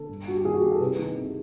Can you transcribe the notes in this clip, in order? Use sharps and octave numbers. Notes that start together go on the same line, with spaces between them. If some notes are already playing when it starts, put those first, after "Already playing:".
Already playing: D3 A4
G2
G2 F#4
G4
D#3 G#4
F#4
D#3 G4
A4
C2 B4
D#3
C3